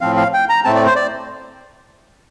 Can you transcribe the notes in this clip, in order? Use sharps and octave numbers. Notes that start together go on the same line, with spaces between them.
A2 F3 C4 F5
F5
G5
A#5
A2 A3 C4 A5
D5
C5
D5